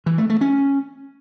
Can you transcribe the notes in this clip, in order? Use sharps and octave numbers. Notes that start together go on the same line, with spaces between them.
E3
A3
A3
C#4